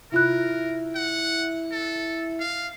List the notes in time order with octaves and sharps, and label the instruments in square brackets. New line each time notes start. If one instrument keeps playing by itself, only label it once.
[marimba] C3 F4 F#6 [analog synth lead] E4 [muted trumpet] A#4
[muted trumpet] F#5
A4
F5